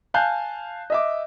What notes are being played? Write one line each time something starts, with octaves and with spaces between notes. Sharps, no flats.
F5 G#5 A5 F#6 G6
D#5 E5 D6